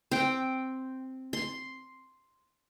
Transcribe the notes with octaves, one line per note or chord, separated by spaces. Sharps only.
C4 G5
C6